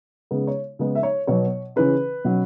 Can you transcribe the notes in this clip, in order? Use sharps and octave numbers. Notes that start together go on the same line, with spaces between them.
C#3 G#3 B3
C#5
C#3 G#3 B3
E5
C#5
B2 F#3 B3 C#5
C#3 E3 C#4 B4
B2 F#3 C#4